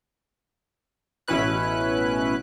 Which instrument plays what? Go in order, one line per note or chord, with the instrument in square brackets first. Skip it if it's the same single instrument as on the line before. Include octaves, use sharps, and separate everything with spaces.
[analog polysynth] A1 B2 C#4 E4 B4 F#6